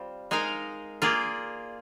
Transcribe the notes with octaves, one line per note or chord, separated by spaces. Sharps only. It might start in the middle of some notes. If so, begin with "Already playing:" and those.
Already playing: G3 C4 F4
G#3 D#4 A#4 F5
A#3 F4 G#4 D5